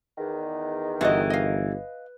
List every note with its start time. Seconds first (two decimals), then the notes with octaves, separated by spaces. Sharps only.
0.18 E2 D#3
1.01 G1 E3 F4 F#4 D#5
1.30 D#5 F5